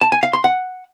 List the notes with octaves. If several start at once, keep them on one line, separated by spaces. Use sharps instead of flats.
A5
G#5
F5
C6
F#5